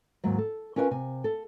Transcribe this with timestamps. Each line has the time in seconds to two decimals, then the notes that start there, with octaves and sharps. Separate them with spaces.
0.24 D#2 G#2 F#3
0.38 A4
0.76 C#4 F4 A#4 B4 G5 G#5
0.91 C3 G#5
1.24 A4